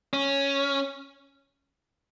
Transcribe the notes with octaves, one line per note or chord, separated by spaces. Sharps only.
C#4